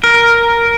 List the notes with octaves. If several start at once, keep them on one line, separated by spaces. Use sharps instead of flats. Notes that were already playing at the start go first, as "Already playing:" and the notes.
A#4